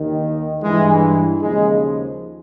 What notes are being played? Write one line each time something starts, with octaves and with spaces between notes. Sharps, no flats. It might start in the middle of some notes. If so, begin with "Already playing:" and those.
Already playing: D#2 D#3
G2 E3 G#3
D#2 C#3 F3 G#3